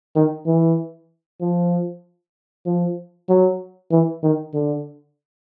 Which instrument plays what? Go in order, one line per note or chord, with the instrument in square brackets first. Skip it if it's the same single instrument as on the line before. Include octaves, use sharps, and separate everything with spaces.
[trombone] D#3
E3
F3
F3
F#3
E3
D#3
D3